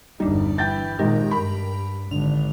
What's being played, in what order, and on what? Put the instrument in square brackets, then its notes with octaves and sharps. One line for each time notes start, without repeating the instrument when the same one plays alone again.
[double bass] G1 E2 [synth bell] G3 D4 [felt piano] D#4
[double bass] E3 [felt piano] G5 G6 A6
[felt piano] G#1 D#4 [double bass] A#2 G#3 [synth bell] G4 A#4
[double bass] G2 [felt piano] B5
[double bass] G#1 [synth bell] D3 F7